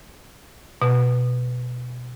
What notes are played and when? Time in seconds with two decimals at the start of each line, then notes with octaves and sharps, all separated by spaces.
0.82 B2